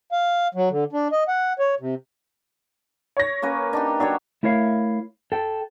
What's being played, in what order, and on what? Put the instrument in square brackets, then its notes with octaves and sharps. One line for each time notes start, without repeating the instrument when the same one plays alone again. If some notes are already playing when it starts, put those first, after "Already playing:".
[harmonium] F5
F#3
D3
D4
D#5
F#5
C#5
C3
[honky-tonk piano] C#5 A#6
[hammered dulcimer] A#3 C#4 B4
D4 D#4 G4
[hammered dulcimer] F#3 G4 C#5 [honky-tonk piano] D4
[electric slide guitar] A3 E4 A#4 C#5 F5
A4 G5